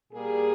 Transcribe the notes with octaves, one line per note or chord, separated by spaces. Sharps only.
A#2 G3 A#3 G#4